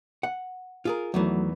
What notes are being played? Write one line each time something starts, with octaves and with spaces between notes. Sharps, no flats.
F#5
F4 G#4 A#4
E2 D#3 E3 F#3 A3